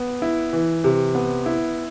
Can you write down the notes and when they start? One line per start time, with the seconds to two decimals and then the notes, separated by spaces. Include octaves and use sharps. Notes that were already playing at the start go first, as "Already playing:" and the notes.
Already playing: B3
0.22 E4
0.53 E3
0.84 C3
1.15 B3
1.46 E4